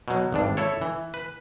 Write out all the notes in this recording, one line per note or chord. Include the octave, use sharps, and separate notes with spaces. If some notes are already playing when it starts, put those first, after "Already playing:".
B2 F#3
G#1 G2 D4
E4 A4 C#5
E3
B4